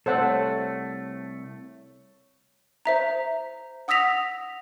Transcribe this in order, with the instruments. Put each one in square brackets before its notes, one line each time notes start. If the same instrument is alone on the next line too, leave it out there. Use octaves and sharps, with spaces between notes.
[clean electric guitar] C2 A3 [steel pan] A4 C5 F#5 [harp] C#5
[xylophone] C5 E5 A#5
F#5 D#6 E6 A#6 B6 F7